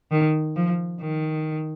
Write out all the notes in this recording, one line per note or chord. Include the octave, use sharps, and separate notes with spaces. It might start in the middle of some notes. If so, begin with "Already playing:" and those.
D#3
F3
D#3